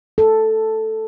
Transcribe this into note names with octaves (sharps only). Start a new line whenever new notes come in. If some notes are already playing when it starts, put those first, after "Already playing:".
A4